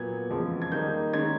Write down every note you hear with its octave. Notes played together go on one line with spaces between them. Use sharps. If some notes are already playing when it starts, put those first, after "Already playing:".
Already playing: A#2 F#3 B3 G#6
E2 C#3 F3 G#3 C4
G#6
D#3 G3 A#3 D#4 G6
D#3 G#3 C#4 G#6